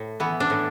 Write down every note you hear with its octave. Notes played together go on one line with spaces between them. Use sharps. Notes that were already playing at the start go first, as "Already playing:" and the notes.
Already playing: A2
E3 B3
D4
A2